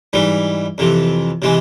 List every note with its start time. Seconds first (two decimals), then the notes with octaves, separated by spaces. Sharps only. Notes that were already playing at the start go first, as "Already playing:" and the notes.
0.13 G#2 E3 G3
0.78 F2 C3 E3
1.42 C3 E3 G#3